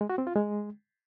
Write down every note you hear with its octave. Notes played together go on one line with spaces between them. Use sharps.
G#3
F#4
C4
F4
G#3